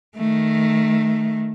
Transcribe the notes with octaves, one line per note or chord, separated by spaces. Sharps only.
D#3 A3